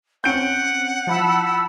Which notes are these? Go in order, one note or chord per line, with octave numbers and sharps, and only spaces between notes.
C4 C#4 F#5 G6 D7
F3 E4 A5 B5 E6